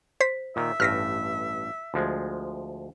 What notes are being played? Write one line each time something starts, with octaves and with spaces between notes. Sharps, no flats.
C5 B6
A#2 D#3 E5
A1 G2 A3 F6 A#6 B6
D2 F3 G#3